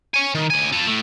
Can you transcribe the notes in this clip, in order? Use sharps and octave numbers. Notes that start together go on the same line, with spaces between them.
C#5 G#5
D#3
D2 G#5
F4 A4
A2 A3